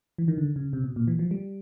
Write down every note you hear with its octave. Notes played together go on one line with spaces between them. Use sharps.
E3
D#3
D3
C#3
C3
B2
A#2
E3
F3
G3